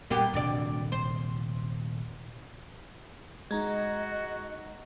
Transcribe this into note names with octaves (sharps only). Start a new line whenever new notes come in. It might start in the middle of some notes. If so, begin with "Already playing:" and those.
A#2 G3 A#3 B3 G4
D#1 D2 C3 D5
C5
G#3 D#4 F#4 D#5 A#5 G#6